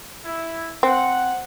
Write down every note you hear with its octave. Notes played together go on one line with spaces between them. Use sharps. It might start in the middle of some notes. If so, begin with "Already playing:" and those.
E4
C4 F#5